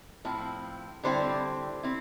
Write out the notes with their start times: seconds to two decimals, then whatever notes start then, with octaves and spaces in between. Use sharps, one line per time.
0.25 A2 F3 C4 E4
1.03 D3 G3 C4 E4 C5
1.83 C4 E4